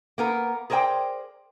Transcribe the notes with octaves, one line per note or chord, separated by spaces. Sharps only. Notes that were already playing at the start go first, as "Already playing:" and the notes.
A#3 B3 A#4
G#4 A#4 C5 D5 G5